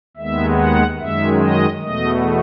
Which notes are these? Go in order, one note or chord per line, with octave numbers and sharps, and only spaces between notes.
D#2 D#3 G#3 B3 E5
F#5
F#2 D#3 G#3 E5
D#5
E2 B2 A3 D#5